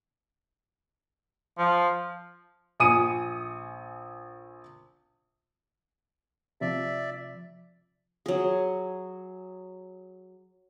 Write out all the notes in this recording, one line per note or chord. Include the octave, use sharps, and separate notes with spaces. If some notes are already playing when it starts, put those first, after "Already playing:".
F3
A#1 G#5 D#6 C#7 D#7
C3 F3 D5 E5
F#3 G#4